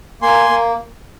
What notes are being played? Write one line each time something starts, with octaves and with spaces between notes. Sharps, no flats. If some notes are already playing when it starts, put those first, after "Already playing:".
A#3 G#5 C6
A#3